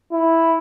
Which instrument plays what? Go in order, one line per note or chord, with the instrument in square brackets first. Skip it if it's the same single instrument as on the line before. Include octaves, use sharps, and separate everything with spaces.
[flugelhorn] E4